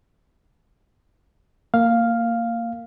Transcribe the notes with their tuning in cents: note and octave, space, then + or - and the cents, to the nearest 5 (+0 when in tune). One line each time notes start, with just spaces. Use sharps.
A#3 -20 F5 +0